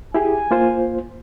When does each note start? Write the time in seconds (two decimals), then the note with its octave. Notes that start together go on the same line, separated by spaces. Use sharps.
0.14 E4 G4 G#4 G#5
0.51 A#3 F4 C5